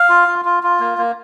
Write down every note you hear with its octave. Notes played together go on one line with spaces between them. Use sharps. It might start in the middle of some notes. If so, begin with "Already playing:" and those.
Already playing: F5
F4
F4
F4
F4
A#3
A#3